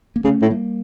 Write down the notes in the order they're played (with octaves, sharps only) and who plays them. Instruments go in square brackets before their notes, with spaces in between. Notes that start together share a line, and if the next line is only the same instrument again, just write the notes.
[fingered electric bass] A#3
[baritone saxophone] C#3 [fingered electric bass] A3 C#4
[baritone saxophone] A2
[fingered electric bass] G3 A#3